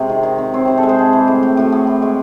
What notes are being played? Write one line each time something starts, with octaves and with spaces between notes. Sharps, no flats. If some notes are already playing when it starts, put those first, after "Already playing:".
Already playing: C3 G#3 C4 F#4 G#4
D#3
D#3
C4
C4 C#5
C3 C5
A4
G#3
G#4 C5
G#3
E3
A2
A2
A2 F#4
A2 G#4
E3
G#3